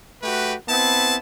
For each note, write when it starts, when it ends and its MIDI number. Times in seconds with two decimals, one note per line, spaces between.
0.23 0.54 57
0.23 0.54 66
0.23 0.54 67
0.23 0.54 71
0.68 1.16 59
0.68 1.16 60
0.68 1.16 64
0.68 1.16 81